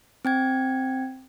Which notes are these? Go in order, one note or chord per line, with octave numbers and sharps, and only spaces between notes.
C4 G5 G#6